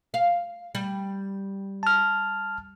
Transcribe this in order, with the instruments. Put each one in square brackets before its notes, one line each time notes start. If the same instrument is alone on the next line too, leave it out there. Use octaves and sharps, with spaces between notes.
[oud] F5
G3
[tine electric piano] A5 F6